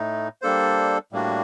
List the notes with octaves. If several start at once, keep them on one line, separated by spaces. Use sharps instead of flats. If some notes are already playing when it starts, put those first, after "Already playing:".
Already playing: A2 A3 D#4
G3 A#3 D4 A4 C5
A2 G3 A#3 D4 F#4